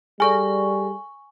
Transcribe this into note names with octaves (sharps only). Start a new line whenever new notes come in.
G3 G#4 A4 D5 G#5 C#6